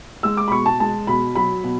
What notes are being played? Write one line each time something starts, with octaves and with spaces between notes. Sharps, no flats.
G#3 E6
D6
B5
B2 C#6
A5
G#3 A5
B2 B5
F#3 B5
B2